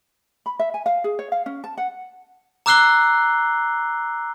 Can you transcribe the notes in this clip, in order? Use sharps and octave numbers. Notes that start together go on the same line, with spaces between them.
B5
E5
G#5
F5
G#4
C#5
F5
C#4
A5
F#5
A#5 D6 E6 F#6 C7 G7